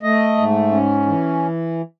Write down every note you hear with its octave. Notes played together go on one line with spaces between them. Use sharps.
A3 D#5
G#2
C#4
E3